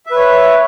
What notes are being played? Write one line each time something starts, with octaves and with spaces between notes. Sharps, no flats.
B4 C#5 E5